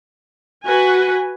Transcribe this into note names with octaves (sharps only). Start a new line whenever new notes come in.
F#4 B4 G#5